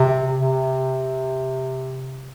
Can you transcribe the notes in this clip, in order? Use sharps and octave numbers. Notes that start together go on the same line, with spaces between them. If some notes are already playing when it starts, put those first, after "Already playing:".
Already playing: C3
C3